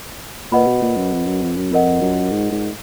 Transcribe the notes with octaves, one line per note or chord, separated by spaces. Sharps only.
A#2 B4 D#5 F#5 B5
B2
A#2
F#2
F2
F#2
F2
F#2
F2 F4 A#4 D#5 F#5
F#2
G#2
G#2